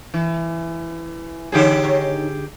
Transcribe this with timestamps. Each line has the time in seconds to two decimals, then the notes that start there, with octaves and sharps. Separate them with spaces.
0.14 E3
1.52 D3 D#3 C#4 G4 G#4
1.83 D#3 D#4 C#5